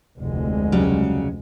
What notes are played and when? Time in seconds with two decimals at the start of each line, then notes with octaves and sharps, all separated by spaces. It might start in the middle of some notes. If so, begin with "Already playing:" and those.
0.19 F1 D2 G#3
0.72 C#3 F#3 G3